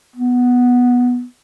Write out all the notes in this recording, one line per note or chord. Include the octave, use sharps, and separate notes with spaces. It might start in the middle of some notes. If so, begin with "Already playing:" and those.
B3